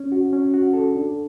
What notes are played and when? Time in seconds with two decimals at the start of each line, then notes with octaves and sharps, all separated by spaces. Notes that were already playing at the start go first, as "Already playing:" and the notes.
Already playing: C#4
0.12 F#4
0.33 C#4
0.54 F#4
0.73 A4
0.95 D4